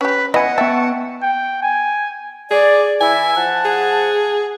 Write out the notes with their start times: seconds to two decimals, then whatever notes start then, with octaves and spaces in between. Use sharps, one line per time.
0.01 C#4 G4 B4
0.34 B3 E4 D#5 F#5 G#5
0.58 B3 E5 G5 A5 C#6
1.22 G5
1.63 G#5
2.51 G#4 D5
3.01 E3 E4 E5 G#5
3.36 F3 F#5 A5
3.65 G#4